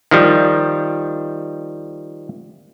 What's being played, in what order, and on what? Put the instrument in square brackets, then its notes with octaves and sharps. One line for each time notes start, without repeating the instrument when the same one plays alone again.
[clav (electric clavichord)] D#3 F3 G3